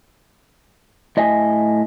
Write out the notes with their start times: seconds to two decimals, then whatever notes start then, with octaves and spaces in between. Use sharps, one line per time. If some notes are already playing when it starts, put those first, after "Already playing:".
1.17 A2 D#5 E5 G#5